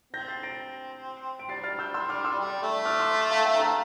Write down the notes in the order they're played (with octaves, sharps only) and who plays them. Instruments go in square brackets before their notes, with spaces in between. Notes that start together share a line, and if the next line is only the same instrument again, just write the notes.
[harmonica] C4 [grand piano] G6 A#6
[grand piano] A6 C7
A#6 D7
D7
[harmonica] G3 [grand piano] A6 C7
[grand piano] F6 A6
E6 G6
C6 E6
D6 F6
C6 E6
[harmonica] G3
A3
[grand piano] D6 F6
C6 E6
F5 A5
E5 G5
A#5
F5 A5